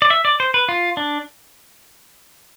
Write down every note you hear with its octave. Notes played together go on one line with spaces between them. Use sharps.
D5
E5
D5
C5
B4
F4
D4